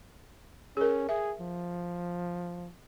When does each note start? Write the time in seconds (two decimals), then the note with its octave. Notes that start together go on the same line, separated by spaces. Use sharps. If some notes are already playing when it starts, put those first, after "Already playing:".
0.77 C#4 G#4 A#4
1.09 G#4 E5
1.41 F3